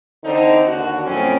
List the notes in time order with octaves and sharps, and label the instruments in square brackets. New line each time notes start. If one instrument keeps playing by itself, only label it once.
[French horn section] D3 E3 C4 D#4
D#2 D3 F#4
F2 A2 F#3 C4 C#4